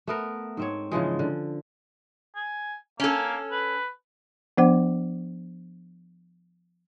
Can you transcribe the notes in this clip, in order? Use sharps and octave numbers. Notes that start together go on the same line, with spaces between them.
A3 B3 A#4
G#2 C4 C#5
C#3 E3 F3 G#3
D3
G#5
A#3 C#4 A4
B4
F3 B3 D4 C5 F#5 D6